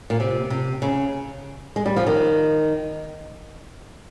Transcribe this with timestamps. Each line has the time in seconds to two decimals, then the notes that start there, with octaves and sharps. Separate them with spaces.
0.10 A#2
0.20 C3
0.50 C3
0.82 C#3
1.76 G#3
1.86 G3
1.96 F3
2.07 D#3